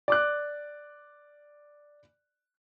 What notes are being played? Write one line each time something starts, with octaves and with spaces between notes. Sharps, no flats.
D5 D6 F#6